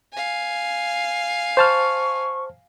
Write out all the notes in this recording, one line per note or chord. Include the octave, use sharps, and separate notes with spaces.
F5 G#5
C5 A5 C#6 F6